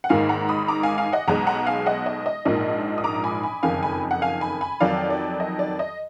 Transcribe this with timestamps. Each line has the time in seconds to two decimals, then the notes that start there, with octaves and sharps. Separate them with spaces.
0.04 F#5
0.09 G#1 G#2 D#3 A#3 F5 G#5
0.29 F#5 A#5
0.49 B5 D#6
0.68 A#5 D6
0.83 F5 G#5
0.98 F5 G#5
1.13 D#5 F#5
1.28 B1 B2 G#3 F#5 A#5
1.47 F#5 A#5
1.67 F5 G#5
1.86 D#5 F#5
2.06 D#5
2.26 D#5
2.45 A#1 G#2 F3 A#3 D#5
2.98 D#6
3.04 A#5 D6
3.24 G#5 B5
3.43 G#5 B5
3.63 F#1 F2 D#3 F5 G#5
3.83 G#5 B5
4.11 F#5
4.22 F5 G#5
4.41 G#5 B5
4.61 G#5 B5
4.80 F2 D#3 F#3 D5 F5
5.10 D5
5.40 D#5
5.59 D5
5.79 D#5